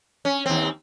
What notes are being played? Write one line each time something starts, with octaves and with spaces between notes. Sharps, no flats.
C#4
D#2 C4